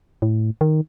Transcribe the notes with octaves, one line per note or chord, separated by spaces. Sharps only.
A2
D#3